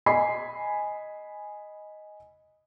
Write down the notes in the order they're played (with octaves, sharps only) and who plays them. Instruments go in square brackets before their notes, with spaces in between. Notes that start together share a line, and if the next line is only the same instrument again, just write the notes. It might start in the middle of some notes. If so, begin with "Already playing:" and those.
[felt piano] D#5 G#5 B5 C7